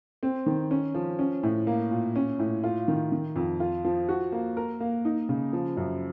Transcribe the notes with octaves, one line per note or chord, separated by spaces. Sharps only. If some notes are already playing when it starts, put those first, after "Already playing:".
C4
D#3
C#4
F3
C#4
A2
A#3
A#2
C#4
A2
F4
D#3
D#3
F2
F4
F3
F#4
A#3
A#4
A#3
D#4
C#3
F3
F#2